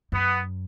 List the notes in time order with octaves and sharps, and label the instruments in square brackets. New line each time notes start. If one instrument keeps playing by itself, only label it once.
[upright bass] F#2 [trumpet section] B3